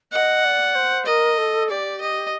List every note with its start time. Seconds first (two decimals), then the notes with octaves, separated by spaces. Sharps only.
0.12 D#5 F#5
0.44 D5
0.75 C5
1.06 A#4 D#5
1.37 A4
1.70 G4 D5
2.01 D#5